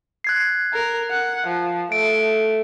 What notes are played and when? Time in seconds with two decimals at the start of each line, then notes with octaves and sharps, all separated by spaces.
0.24 F#6 G#6 C7
0.73 A#4
1.10 F#5
1.47 F3
1.92 A3 D7